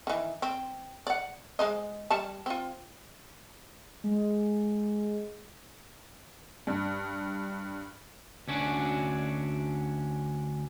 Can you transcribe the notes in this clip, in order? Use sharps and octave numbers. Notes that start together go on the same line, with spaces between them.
D#3 E3
C4
D5 F#5
G#3 C5 D#5
G3 A5
C4 F4
G#3
G2
D2 C#4 D4 F#4